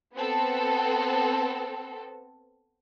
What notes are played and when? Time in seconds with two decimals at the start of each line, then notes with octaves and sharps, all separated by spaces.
0.15 B3 C4 A4